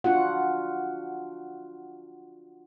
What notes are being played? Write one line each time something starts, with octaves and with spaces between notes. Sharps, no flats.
D4 F4 F#4 F#5